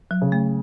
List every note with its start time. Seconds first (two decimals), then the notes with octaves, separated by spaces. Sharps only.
0.11 F#3
0.22 C#3
0.32 A3